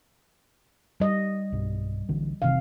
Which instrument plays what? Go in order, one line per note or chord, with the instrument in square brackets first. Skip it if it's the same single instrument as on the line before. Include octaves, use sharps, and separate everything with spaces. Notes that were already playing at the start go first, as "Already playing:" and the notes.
[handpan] G3 D#5
[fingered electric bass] B1 G2
A#1 D3 E3
[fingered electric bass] F1 D#3 E3 [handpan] C3 F5